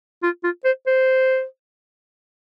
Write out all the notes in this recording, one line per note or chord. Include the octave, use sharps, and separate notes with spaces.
F4
F4
C5
C5